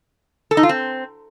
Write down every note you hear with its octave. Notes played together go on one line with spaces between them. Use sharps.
A4
D#4
F4
C4